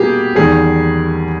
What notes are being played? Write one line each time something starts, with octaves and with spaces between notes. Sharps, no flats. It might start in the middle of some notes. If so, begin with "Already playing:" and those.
Already playing: B2 G3 A#3 G4 G#4
E2 D#3 G3 G#4